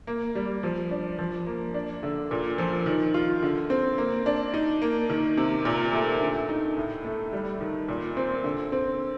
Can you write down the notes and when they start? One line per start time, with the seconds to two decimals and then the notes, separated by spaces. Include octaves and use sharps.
0.07 A#3
0.35 G3
0.63 F3
0.91 D4
1.19 F3
1.47 A#3
1.74 D4
2.03 D3
2.31 A#2
2.58 F3
2.86 D#3
3.14 F4
3.42 D3
3.70 C4
3.98 A#3
4.26 D4
4.54 D#4
4.82 A#3
5.10 D#3
5.37 C3
5.65 A#2
5.93 A3
6.21 D3
6.49 D#4
6.77 A2
7.04 A3
7.33 G3
7.61 D#3
7.88 A#2
8.17 C4
8.44 D3
8.72 C4